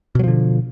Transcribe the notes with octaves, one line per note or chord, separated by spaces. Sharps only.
B2 D3 F3 F#3